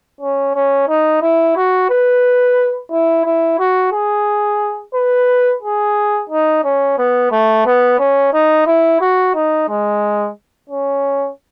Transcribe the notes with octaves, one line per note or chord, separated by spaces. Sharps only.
C#4
C#4
D#4
E4
F#4
B4
E4
E4
F#4
G#4
B4
G#4
D#4
C#4
B3
A3
B3
C#4
D#4
E4
F#4
D#4
G#3
C#4